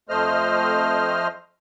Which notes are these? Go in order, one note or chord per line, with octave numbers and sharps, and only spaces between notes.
F2 A3 C5 D#5 F6